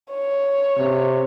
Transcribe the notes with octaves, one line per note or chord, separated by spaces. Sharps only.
C#5
C3